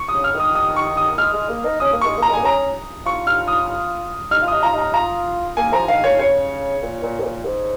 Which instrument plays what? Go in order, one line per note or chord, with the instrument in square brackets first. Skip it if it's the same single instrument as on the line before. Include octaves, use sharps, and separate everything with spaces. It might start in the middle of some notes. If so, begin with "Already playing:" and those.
Already playing: [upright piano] C#6
D#6
[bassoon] C#3
[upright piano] F6
[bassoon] D#3 [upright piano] D#6
[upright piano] D#6
C#6
D#6
[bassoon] G#3 [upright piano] F6
[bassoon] G#3
A#3
D#4
[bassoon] C#4 [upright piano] D#6
[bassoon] A#3
[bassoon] G#3 [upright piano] C#6
[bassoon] A#3 [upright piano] A#5
[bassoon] G#3
[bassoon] A#3 [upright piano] G#5
[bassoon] C#4 [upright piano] A#5
[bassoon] F4 [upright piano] C#6
[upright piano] F6
D#6
[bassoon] D#4 [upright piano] F6
[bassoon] F4
[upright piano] D#6
[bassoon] D#4
[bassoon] F4 [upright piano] A#5
[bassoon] D#4 [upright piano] A#5
[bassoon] F4 [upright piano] A#5
[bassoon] A#3 [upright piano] G#5
[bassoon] F3 [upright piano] A#5
[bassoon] D#3 [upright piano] F5
[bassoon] A#2 [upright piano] C#5
[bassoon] C#3 [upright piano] C#5
[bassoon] A#2
A#2
G#2
A#2
G#2